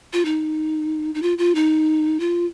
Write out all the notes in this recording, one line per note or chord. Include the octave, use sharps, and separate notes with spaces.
F4
D#4
D#4
F4
F4
D#4
F4